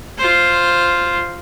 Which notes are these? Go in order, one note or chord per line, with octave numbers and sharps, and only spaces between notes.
F4 C5